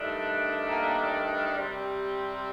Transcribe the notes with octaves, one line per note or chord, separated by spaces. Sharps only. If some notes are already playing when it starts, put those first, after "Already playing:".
Already playing: G2 D#3 A3 D4
A#3 A#4
C3 G3 C4